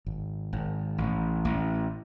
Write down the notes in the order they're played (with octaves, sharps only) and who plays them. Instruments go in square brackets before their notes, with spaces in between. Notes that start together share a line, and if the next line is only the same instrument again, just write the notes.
[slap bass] G#1
G#1
A1
A1